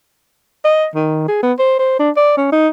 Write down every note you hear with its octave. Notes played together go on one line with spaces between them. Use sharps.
D#5
D#3
G#4
B3
C5
C5
D4
D5
C#4
D#4